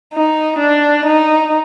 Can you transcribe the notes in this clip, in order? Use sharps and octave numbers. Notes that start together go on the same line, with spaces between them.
D#4
D4
D#4